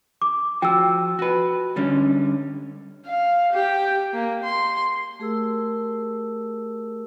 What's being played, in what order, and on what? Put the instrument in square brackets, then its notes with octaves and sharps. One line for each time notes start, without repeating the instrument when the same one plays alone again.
[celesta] D6
[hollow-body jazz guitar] F3 F#4 [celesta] G5 E6
[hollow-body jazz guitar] F#4 B4
D3 G3 C#4
[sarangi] F5
G4
A#3
C6
[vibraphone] A3 G4 G#4 A#4 E6